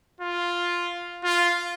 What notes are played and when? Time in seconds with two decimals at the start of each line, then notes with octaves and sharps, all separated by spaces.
0.20 F4
1.24 F4